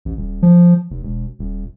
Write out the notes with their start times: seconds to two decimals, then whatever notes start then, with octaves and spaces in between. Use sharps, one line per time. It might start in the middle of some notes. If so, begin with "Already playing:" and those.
0.05 A1
0.17 D#1
0.42 F3
0.90 F1
1.03 E1
1.39 D#1